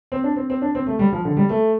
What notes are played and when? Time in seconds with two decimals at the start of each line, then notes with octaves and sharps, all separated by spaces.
0.12 C4
0.24 D4
0.36 C4
0.50 C4
0.62 D4
0.75 C4
0.86 A3
0.99 G3
1.12 F3
1.25 D3
1.37 G3
1.49 A3